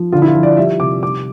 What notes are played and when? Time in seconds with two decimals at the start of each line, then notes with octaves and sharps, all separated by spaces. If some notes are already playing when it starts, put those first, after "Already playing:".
Already playing: F3
0.12 D3 F4
0.22 E4
0.27 F4
0.35 F3
0.43 D5
0.57 G3 E5
0.80 C3 D6
1.02 G3 D6